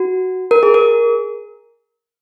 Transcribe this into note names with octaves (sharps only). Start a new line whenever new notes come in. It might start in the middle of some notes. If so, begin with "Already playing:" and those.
Already playing: F#4
A#4
G#4
A#4